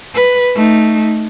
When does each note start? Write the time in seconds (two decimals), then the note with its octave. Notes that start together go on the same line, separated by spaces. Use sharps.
0.14 B4
0.55 A3 D#4